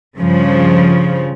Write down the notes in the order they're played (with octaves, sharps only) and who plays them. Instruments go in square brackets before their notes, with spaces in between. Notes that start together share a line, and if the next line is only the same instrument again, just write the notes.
[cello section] G2 C#3 F3